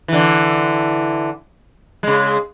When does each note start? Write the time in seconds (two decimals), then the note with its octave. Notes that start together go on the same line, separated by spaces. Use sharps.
0.08 D3 E3
2.03 C#3 G#3